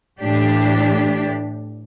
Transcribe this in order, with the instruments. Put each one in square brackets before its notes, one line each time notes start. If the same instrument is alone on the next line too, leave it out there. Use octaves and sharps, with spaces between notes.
[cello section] A2 E3 D4 G4